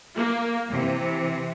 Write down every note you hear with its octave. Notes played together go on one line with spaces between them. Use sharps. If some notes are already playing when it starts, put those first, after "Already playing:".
A#3
C3 E3